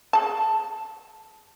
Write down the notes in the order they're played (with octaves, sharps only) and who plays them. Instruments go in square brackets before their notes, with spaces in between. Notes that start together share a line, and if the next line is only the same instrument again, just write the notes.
[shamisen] G#4 A5